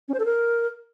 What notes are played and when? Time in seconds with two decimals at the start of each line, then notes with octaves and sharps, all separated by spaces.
0.08 C#4
0.14 C5
0.20 A4
0.25 A#4